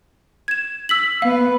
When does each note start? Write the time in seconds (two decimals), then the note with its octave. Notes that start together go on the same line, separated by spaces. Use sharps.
0.48 G#6 E7
0.89 E6 B6 F#7
1.22 B3 B4 F5